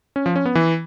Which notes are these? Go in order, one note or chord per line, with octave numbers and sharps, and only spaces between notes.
C#4
F3
C#4
B3
E3